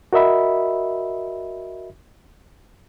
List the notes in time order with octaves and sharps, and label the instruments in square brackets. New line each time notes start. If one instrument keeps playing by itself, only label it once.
[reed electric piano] F#4 A#4 D#5 E5 B5